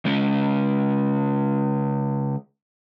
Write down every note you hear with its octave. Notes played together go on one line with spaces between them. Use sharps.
C#3 G#3 C#4